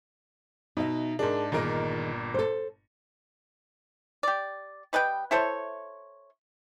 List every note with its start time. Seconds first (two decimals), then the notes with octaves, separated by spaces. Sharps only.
0.77 B2 D#4 E5
1.19 G#2 D4 G#4 A#4 A5
1.52 G1 A#2 D#3 G#4 A#4 D#5
2.34 A4 C5
4.23 G4 D5
4.93 G3 B4 D#5 G5
5.31 E4 A4 C5 C#5